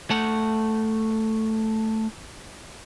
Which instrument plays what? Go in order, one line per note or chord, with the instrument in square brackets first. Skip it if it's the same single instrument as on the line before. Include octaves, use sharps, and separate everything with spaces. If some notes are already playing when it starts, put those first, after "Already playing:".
[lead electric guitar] A3 F#5